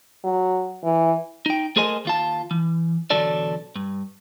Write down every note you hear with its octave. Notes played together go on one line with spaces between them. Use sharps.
F#3
E3
D#4 G5
A3 G#4 A#4 C5 D#5 G#5
D#2 F4 A5
E3
B1 E2 D3 F#3 A4 D5
G2